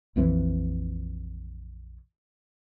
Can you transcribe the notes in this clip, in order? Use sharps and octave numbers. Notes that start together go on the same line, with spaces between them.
A#1 F2 E3 F3